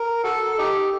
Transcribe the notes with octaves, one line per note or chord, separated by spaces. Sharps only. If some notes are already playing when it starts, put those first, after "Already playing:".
Already playing: A#4
F#4 A4
A4
D#4 G4